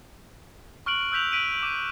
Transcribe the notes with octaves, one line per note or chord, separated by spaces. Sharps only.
C#6 F6 F#6 D7 F#7
E6 F#6 G6 B6 F7 F#7
B6 D7 D#7
D6 D#7